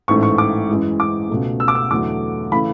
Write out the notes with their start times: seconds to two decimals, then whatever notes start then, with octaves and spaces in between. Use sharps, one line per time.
0.08 A1 G#2 E3 A3 C#6
0.23 C#6
0.38 D6
0.68 F#2 E3 G#3
1.00 D6
1.29 C#2 B2 A3
1.60 E6
1.68 D6
1.75 E6
1.91 E2 D3 F#3 A3 D6
2.52 C#3 E3 A3 B5